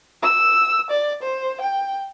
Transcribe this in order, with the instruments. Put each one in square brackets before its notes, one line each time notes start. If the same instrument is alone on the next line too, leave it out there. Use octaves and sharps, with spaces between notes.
[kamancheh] E6
D5
C5
G5